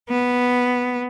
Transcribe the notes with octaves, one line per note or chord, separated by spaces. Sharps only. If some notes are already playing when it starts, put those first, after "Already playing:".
B3